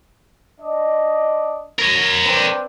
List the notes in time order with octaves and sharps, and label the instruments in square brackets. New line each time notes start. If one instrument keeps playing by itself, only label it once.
[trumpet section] D4 D#5
[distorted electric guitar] A#4 C#5
[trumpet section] C4 D4 B4